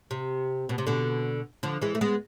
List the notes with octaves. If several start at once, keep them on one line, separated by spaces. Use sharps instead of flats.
C3
B2
C3
B2 D3
D3 F3
E3 G#3
A3
G#3 B3